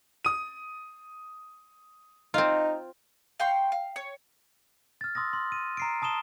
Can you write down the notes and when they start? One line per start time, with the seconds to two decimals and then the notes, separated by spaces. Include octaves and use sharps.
0.25 D#6 D#7
2.34 C4 D#4 F4
3.40 F5 G5 C6 C#6
3.72 F5
3.96 C#5
5.01 F6 A6
5.15 C6 D#6 E6 A#6
5.33 C6
5.52 D#7
5.77 A#5 C7 D7
6.02 A5 D#6 C7 E7 G7